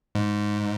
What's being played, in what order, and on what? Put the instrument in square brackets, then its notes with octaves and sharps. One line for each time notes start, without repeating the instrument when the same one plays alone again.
[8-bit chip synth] G#2